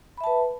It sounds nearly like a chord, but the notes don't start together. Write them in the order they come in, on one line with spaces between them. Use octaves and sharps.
B5 E5 A5 B4